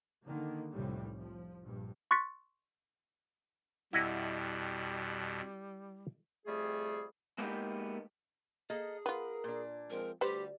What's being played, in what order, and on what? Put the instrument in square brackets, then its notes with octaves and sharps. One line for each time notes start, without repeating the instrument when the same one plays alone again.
[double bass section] D3 D#3 A#3
F1 C2 A2 G3
F3
A#1 G2
[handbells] C6 C#6 F#6 A6 B6 C#7
[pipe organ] F2 B2 [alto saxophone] G3 [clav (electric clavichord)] E4 D#5 F#5
[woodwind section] F2 G3 A3 G#4
[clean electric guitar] G#3 A#3 B3 C#4 D#4 G4
[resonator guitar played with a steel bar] A#3 A4 D#5 [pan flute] G#4
[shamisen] B3 F4 [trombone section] A#4 [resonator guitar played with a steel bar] B4
[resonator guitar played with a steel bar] A#2 D4
[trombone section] F3 G#3 C4 [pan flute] A#4
[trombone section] D2 [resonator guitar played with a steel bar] G3 [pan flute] G4 [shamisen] B4 C5